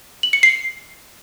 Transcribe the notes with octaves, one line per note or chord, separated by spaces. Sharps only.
F#7
C#7
C7